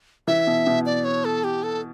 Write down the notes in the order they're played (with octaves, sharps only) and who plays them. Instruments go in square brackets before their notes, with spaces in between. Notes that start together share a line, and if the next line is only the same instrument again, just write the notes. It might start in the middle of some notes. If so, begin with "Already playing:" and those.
[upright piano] E3 [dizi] E5
[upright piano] B2
B2
[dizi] D5
C#5
A4
G4
A4